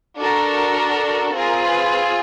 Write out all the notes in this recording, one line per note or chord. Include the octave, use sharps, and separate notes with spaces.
D4 F#4 A4 A#4
C4 F4 G#4 A#4
B4